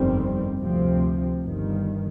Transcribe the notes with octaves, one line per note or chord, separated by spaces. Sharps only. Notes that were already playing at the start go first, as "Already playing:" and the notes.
Already playing: G1 F2 D#3 G3 C4
D2 C3 F3 C4
G1 G2 D#3